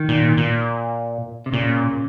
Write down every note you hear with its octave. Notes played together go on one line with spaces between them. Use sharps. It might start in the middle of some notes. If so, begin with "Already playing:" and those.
Already playing: D#3
A#2
A#2
C3
A#2 C#3